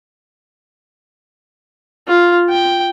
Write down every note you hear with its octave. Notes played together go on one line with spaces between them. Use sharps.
F4
G5